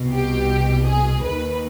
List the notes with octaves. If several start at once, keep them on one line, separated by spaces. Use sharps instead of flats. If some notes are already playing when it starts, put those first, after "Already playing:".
Already playing: C2 B2
G4
G#4
D#2 D#3 B4